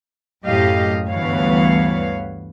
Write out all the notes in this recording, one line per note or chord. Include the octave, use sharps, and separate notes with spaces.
F#2 A2 G4 D#5 F5
D2 G2 E3 B3 C#5 F5